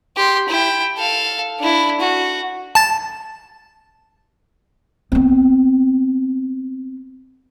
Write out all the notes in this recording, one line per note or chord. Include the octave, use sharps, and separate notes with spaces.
G4 C6
E4 G5
A4 F5
D4 E4
F#4
A5 A6
B3 C4